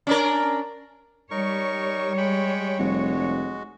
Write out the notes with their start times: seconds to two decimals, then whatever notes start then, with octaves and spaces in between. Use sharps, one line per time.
0.07 C#4 D4 A#4
1.31 G3 D#4 A#4 C#5 C#6
2.18 G#3 G5 B5
2.79 F1 G#3 F#4